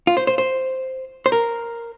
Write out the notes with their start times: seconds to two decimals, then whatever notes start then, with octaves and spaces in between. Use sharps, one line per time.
0.07 F4
0.17 C5
0.27 C5
0.38 C5
1.26 C5
1.32 A#4